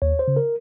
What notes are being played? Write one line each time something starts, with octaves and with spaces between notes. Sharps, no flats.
D#2 C#5
C5
C#3
A#4